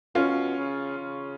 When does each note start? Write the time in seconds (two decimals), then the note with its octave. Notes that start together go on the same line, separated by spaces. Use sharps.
0.15 B2 C#4 F4
0.57 C#3
0.98 C#3